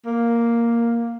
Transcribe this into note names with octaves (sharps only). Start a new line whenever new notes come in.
A#3